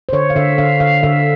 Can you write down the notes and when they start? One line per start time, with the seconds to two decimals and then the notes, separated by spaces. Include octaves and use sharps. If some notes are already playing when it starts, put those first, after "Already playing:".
0.09 C5
0.13 D3 C#5
0.30 F5
0.36 D3 E5
0.58 D3 F5
0.80 D3 F5
1.03 D3 E5